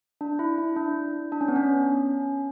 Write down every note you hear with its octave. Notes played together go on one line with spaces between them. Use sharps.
D4
E4
E4
D4
D4
C#4
B3
C#4